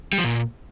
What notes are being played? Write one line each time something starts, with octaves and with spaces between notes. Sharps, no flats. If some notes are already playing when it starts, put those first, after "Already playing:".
G3
F3
A#2